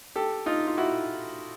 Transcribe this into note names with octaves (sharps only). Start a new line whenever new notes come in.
G4 A4
D#4 F4
F4
E4 F#4